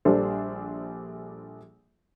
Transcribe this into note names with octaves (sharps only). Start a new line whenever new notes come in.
A#1 G3 D4 A4 C5